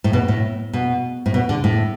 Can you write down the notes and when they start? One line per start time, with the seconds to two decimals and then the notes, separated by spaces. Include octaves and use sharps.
0.04 A2
0.13 B2
0.28 A2
0.73 B2
1.26 A2
1.34 B2
1.49 D3
1.64 A2